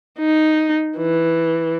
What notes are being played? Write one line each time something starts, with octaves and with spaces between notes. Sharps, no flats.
D#4
E3